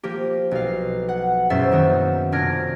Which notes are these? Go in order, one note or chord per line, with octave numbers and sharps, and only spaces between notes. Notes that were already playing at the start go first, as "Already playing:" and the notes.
F3 A#3 G4
B1 F5
F#5
E1 F#2 F#3 C5 E5 A6
D#3 A#3 B3
F1 D4 F6 G#6 A#6 D7